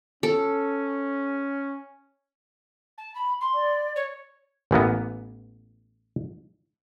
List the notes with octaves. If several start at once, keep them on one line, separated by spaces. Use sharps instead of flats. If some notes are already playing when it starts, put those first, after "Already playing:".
C#4 A4
A5
B5
C6
D5
C#5
A1 E3 A#3 B3